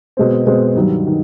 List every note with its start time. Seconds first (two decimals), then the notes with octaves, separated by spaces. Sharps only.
0.17 B2 G#3 C4
0.46 B2 G#3 C4
0.75 G2 D#3 F#3
1.07 D#3